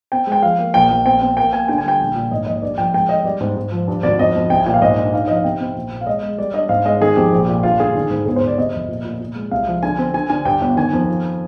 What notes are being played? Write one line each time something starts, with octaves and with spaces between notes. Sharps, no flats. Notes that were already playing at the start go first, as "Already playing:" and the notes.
C4 G5
G#3
G5
F3 F5
A#3
A#1 G5
A#1
C4 G5
C4
A#3 G5
A#3 G#5
D3 G5
G#5
G3 G5
A#1
A#2
G#2 D#5
A#1 D#5
G2 D5
F3 G5
G#3 G5
G2 D#5
G3 D5
G#2
G#2
F3
G2
G#1 D5
F2 D#5
F2
C2 G5
G#5
A#2 G5
F5
G#2 D#5
D4
D#4 F5
F3 D#5
F5
C3 G5
C4
A#1
A#2
F5
G#3 D#5
G#3
G3 D5
D4 D#5
G#2 F5
G#3 D#5
D#3 G#4
F2 G4
A#1
A#2
G2 F4
D3 G#4
D#3
G#2
G1 G#4
C5
G1
D5
C3 D#5
F1
A#2
A#2
A#2
G#3
C2 F5
F3
D3 G#5
C4
D3 G#5
D3 G#5
G2 G5
G1
D#3 G#5
F2
F3